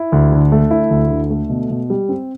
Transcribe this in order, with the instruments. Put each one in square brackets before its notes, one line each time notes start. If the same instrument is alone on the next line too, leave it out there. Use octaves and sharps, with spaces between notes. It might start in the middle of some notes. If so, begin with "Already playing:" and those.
Already playing: [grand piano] E4
D2
D3
A3
E4
D2
D3
A3
B2
B2
G3
C4